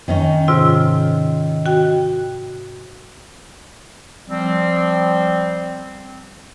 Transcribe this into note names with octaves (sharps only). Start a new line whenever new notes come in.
D#3 C#4 D#4
G#2 C3 F4
F#4 G5
F3 G3 C4